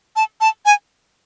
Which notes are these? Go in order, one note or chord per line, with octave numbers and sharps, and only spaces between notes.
A5
A5
G#5